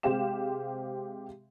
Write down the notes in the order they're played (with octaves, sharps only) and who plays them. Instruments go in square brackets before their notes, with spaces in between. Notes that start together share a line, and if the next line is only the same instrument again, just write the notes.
[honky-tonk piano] C3 G#3 C4 G4 F5 E7